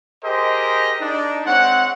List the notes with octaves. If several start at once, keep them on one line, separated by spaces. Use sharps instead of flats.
G4 G#4 A#4 C5 D#5
D4 D#4
G#3 C4 C#5 F#5